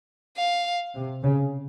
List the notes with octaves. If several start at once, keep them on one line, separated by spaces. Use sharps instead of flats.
F5
C3
C#3